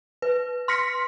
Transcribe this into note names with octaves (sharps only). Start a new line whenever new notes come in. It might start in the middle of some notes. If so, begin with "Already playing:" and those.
B4
C6 F6 A#6 B6 C#7